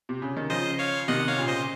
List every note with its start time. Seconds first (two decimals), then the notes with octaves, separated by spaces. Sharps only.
0.09 C3
0.22 C#3
0.37 D#3
0.50 C#3 F3 C5 D#5
0.79 C#5 F5
1.08 C3 D#3 D#5 F#5
1.20 F#5
1.28 C#5 F5
1.38 A#2 C#3
1.48 C5 D#5